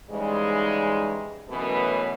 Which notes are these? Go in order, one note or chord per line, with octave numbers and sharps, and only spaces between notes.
G#2 C#3 E3 G3 G#3
F#2 B2 E3 A3 B3 C#4